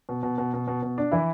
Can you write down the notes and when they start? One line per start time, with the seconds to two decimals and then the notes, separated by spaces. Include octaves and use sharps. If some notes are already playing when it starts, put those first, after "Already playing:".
0.09 B2
0.23 B2
0.38 B2
0.54 B2
0.68 B2
0.83 B2
0.98 D4
1.12 E3 E4